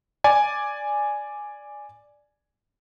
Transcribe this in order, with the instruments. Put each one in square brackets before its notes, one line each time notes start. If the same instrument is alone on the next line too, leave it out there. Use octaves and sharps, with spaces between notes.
[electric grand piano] D5 G#5